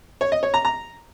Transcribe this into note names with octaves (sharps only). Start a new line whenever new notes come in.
C#5
D#5
C#5
A#5
A#5